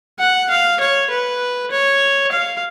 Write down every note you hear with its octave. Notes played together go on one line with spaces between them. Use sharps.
F#5
F5
C#5
B4
C#5
F5